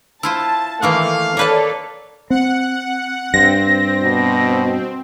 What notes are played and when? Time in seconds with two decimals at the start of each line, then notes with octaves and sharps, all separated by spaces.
0.23 E4 F4 C5 A5
0.83 D#3 E3 A3 A#3 F5
1.37 A#3 A4 B4 C#5 D5 A5
2.30 C4 F#5
3.34 G2 C4 A#6
4.02 B2